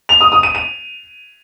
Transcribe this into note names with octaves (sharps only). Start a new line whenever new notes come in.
F7
D#6
D#6
D#7
D#7